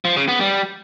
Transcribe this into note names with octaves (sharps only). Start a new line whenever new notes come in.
F3
C#3
B3
G3